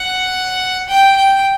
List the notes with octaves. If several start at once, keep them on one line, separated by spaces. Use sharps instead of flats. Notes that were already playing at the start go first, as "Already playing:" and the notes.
Already playing: F#5
G5
G5